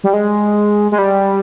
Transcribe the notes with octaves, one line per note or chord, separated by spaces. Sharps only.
G3
G#3
G#3
G3